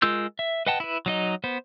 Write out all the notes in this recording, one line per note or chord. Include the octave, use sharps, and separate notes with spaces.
G#3 F4 A#4 E6 G6
E5
B4 D#5 F#5 G5 A5
E4 B4
F#3 D#4 D#5
B3 C5